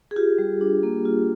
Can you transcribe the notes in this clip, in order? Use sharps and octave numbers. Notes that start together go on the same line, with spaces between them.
G#4
F4 G4
G3
D4
A#3
F4